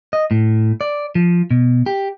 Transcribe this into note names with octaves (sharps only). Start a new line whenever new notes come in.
D#5
A2
D5
F3
B2
G4